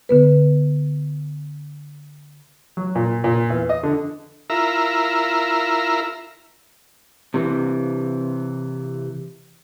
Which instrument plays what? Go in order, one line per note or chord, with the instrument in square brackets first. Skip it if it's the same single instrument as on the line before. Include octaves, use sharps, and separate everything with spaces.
[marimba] D3 B3 B4
[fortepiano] F#3
A#2
A#2
E2
D#5
D3
[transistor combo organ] E4 F4 A#4 E5 A#5
[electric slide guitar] C3 E3